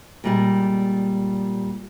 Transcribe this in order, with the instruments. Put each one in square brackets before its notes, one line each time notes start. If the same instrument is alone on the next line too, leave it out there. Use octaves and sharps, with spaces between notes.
[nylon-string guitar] A#2 G3 G#3